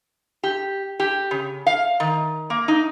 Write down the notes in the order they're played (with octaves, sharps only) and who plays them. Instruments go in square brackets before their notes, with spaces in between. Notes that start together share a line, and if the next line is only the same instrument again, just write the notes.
[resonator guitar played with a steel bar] G4
G4
C#3
F5
D#3
A#3
D#4